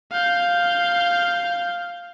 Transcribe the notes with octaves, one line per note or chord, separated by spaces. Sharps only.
F5 G6